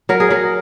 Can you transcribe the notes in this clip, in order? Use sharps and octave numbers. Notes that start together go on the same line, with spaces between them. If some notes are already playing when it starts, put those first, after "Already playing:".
F#3 A#4
G#4
F#3 A#4